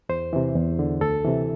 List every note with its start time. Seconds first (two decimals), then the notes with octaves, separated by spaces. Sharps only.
0.09 E2 C5
0.33 C3 E3
0.56 E2
0.79 D3
1.01 D2 A4
1.24 C3 E3